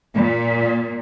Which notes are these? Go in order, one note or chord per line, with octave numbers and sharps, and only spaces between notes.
A#2